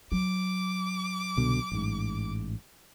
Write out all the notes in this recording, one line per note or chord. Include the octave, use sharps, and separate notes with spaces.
F#3 D6
C2 B2 D3
A1 G#2